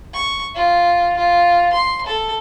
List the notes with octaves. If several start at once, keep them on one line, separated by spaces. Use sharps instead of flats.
C#6
F4
F4
C6
A4